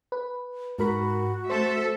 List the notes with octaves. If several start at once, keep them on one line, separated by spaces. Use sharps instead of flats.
B4
G#2 F#4 A#4 B5
A3 A4 C5 E5